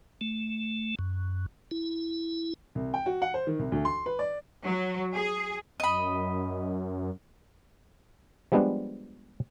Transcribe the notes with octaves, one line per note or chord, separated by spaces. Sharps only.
A3
F#2
E4
C2
G5
F#4
F#5
C5
D#3
C2
D2
C6
B4
D5
F#3
G#4
F#2 D#5 B5
F3 G3 G#3 B3 D4